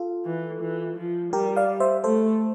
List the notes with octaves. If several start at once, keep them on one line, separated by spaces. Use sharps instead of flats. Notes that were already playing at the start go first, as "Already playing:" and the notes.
Already playing: F4 A4
E3
E3
F3
G3 G4 A#4
D5 F5
C5 E5
A3 A4 C5